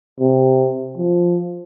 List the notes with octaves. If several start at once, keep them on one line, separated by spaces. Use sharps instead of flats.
C3
F3